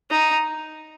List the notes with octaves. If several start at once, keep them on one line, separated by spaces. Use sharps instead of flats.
D#4